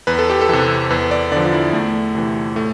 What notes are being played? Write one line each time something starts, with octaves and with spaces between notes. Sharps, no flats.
E2 B4
A4
G4
A4
C3 E3
E2 B4
D5
D3 F3 D5
E4
E2 A3
C3 E3
A2 A3